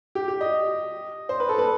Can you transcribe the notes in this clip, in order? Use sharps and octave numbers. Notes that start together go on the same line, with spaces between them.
G4
G4
D#5
C5
B4
A4
B4